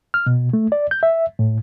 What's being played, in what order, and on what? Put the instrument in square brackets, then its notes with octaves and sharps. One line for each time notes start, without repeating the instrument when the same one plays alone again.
[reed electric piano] F6
B2
A3
D5
G6
E5
A2